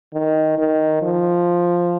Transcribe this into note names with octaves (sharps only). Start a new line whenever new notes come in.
D#3
D#3
F3